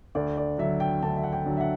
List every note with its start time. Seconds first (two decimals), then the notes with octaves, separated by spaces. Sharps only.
0.15 D2 D5
0.37 D5
0.58 D3 F#3 E5
0.80 G5
1.03 D2 A5
1.16 E5
1.23 F#5
1.32 G5
1.46 D3 F#3
1.57 E5
1.61 F#5